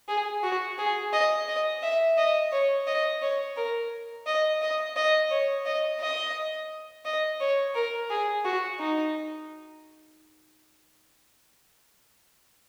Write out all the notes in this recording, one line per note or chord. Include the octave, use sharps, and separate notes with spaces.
G#4
F#4
G#4
D#5
D#5
E5
D#5
C#5
D#5
C#5
A#4
D#5
D#5
D#5
C#5
D#5
D#5
D#5
C#5
A#4
G#4
F#4
D#4